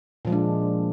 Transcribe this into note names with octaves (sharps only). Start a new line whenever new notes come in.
A#2 F3 G#3 D4